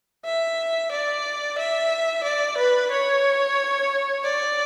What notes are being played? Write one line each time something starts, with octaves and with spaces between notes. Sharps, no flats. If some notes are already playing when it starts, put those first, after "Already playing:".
E5
D5
E5
D5
B4
C#5
D5